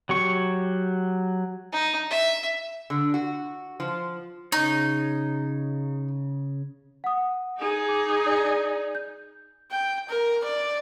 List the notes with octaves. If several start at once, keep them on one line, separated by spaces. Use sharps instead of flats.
F#3 G4 C#6
D#4
E5
D3
F#4
F3
C#3 D#4 C#5
F#5 D#6
D#4 G#4
D6
D5
G6
G5
A#4
D5